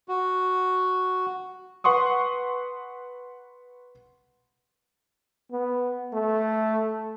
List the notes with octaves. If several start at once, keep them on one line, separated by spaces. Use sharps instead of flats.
F#4
B4 F#5 C6 C#6 D#6
B3
A3